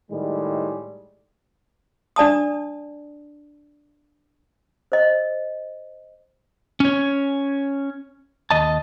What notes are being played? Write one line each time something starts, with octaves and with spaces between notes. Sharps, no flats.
A2 D#3 G3 G#3
D4 D5 A5 D#6
C5 D#5
C#4 C#5
D#2 D#5 A5